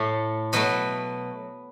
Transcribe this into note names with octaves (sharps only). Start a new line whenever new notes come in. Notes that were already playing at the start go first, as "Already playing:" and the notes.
Already playing: A2 A3
B2 F#3 A3 B4